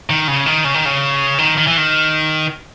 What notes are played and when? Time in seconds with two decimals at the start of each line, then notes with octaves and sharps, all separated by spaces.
0.10 D#3
0.28 C#3
0.46 D#3
0.65 C#3
0.74 D#3
0.85 C#3
1.38 D#3
1.57 D#3
1.67 E3
1.77 D#3